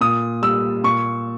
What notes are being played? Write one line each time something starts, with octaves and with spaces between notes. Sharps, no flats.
A#2 D#6
G3 E6
A#2 C#6